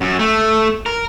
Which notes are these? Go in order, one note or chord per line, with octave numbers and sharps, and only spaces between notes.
F#2
A3
A#4